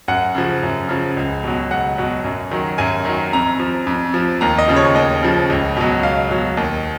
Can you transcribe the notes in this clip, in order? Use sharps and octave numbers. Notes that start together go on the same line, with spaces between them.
F#2 F#5
C#3 F3
F#2
C#3 F3
C#2
B2 F#3
C#2 F#5
B2 F#3
F#2
D#3 F#3
F#2 G#5
D#3 F#3
F2 A#5
F3
F2
F3
D#2 A#5
D#5
C#3 F3
C#5
D#2 D#5
C#3 F3
C#2
B2 F#3
C#2 F5
B2 F#3
D#2